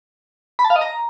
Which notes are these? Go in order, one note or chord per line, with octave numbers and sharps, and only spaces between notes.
B5
A5
F5
D#5
A#5